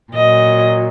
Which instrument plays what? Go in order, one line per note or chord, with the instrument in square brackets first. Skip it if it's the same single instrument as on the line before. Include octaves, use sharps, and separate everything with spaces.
[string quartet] A#2 F#3 D#5